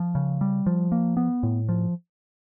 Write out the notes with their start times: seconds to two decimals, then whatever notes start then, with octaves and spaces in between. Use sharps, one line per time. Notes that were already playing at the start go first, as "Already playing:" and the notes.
Already playing: F3
0.15 C#3
0.41 G3
0.66 F3
0.92 A#3
1.17 B3
1.43 A2
1.69 F3